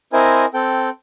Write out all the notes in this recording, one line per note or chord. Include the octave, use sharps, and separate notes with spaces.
C4 E4 A#4 C5 D#5 G#5
C4 A4 G5